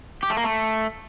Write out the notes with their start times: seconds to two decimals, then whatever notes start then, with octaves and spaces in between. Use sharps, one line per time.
0.23 G4
0.30 A3
0.37 A#3
0.44 A3